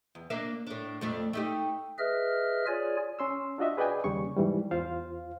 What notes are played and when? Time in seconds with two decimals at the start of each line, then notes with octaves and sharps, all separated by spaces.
0.15 E2
0.30 A#3 D4 E5
0.67 A2 D4
1.01 F2 A3 D4
1.33 A3 D#4 G4
1.98 G#4 B4 D#5 E5 F6
2.67 F4 G#4 C#5 D5 G#5
3.19 C#4 C6 E6
3.58 D4 F4 F#4 D#5 E5
3.77 G#4 B4 D5 D#5 G5 G#5
4.04 D#2 C#3 G3 C#6
4.36 G#2 E3 G3
4.71 E2 F4 C5 F5